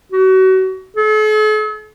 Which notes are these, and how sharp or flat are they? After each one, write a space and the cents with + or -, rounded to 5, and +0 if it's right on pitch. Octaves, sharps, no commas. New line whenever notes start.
F#4 +30
A4 -45